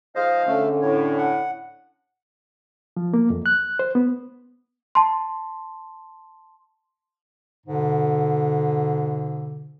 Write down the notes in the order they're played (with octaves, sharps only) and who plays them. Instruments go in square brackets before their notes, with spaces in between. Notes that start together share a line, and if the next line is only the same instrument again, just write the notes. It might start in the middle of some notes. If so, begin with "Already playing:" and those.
[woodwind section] G#2 F3 F5 [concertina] C5 D#5
[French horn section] D3 C#4 [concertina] A3
[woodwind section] A2 [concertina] C#5
[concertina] F#5
[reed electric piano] F3
A#3
F2
F#6
C5
B3
[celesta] A5 C6
[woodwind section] G#2 B2 D3